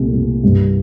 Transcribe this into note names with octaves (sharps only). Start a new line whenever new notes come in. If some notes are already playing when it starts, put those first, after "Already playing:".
Already playing: C2 A#2 A3
C2
G2